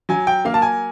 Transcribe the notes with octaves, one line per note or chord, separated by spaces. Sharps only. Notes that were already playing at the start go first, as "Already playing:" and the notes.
F#3 G#5
G5
A#3 F5
A5
G#5